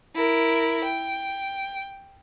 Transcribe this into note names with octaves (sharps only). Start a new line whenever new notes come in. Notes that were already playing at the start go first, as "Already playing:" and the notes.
E4 A#4
G5